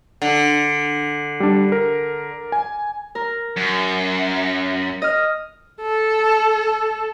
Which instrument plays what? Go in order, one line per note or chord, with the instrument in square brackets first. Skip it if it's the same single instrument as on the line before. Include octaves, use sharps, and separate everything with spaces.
[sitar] D3
[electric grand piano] G3 D4
A#4
G#5
[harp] A#4
[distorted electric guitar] F#2
[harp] D#5 F6
[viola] A4